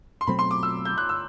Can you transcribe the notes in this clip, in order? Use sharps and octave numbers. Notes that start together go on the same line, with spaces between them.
C6
B2 F#3 A3 C4 B5
C6
D6
E6
G6
F#6
E6